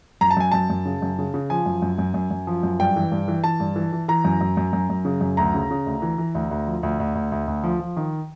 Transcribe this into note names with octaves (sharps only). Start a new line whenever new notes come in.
F#2 A#5
A5
F#2 G#5
F#2 A5
F#2
C#3
F#2
C#3
C#3
F3 G#5
F#2
F#2
F#2
F#2
F#2
F3
F#2
G2 G5
E3
G2
E3
E3 A5
G2
E3
E3
E3 A#5
F#2
F#2
F#2
F#2
F#2
C#3
F#2
D2 A#5
C#3
C#3
D2
E3
E3
D2
D2
F3
D2
D2
D2
D2
D2
F3
F3
D#3